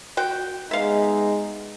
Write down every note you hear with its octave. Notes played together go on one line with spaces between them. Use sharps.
F#4 G5
G#3 B3 D#4 E5 F5